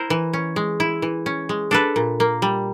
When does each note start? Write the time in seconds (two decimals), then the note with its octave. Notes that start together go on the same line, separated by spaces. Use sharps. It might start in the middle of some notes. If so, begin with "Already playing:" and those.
Already playing: E4 A#4 C5
0.10 E3
0.33 C#4
0.56 G#3
0.80 E4
1.02 E3
1.26 C#4
1.49 G#3
1.71 D4 A4 B4
1.96 A#2
2.20 A#3
2.42 G3